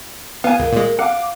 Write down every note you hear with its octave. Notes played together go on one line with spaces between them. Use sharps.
B3 B4 F5 G#5
C#2 A#4
A#2 G#3
F5 F#5 D6